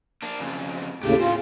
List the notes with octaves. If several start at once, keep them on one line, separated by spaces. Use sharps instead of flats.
A#3 D4
F2 C#3
D#2 A2 C#3 A3 G4
C4 C#4 F4 F5